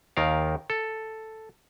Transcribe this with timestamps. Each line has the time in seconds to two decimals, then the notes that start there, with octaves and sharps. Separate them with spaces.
0.17 D#2 D#3 A#4 F5
0.70 A4